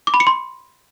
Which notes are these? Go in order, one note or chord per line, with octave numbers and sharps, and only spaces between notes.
D6
B5
C#7
C6